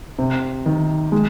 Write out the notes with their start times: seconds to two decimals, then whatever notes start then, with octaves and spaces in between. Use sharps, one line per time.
0.19 C3
0.66 D#3
1.12 G#3